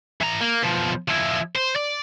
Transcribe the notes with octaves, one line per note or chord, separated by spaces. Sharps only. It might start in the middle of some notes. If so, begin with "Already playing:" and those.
E3 A#5
A#3
B2 F3
F3 E4
C5
D5